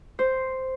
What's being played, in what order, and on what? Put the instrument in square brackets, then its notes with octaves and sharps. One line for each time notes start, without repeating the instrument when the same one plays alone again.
[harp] C5